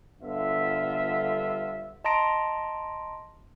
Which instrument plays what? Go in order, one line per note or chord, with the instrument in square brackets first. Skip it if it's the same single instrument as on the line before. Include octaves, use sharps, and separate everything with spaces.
[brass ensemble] G1 G2 D3 B3 F4 E5
[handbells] D#5 A5 A#5 C6 A#6 D7